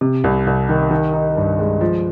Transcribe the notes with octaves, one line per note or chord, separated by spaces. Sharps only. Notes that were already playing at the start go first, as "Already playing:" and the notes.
C3
C2
C2
D#3
D#3
D#4
G2
G#3
F3